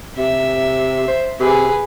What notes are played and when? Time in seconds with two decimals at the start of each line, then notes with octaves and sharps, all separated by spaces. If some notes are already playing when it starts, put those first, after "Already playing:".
0.17 C3 E5
1.08 C5
1.40 C3 G#4 B4